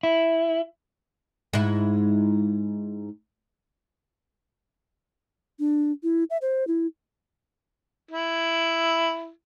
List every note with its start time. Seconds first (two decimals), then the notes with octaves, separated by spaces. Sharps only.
0.03 E4
1.53 G#2 E4
5.59 D4
6.03 E4
6.30 E5
6.42 C5
6.68 E4
8.11 E4